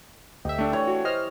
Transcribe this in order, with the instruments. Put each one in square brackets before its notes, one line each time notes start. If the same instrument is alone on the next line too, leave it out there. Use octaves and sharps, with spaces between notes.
[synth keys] D2 E5 [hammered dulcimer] G4 [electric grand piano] D#5
[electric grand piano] A3 D4
[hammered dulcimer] E3 C#5
[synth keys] F#4
[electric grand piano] C5 [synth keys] D#5 F6